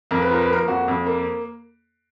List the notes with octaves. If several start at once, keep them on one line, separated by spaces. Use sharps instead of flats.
F2 A#4
B4
F3 A#4
B4
A#3 A#4
F2 F#4
F2
A#3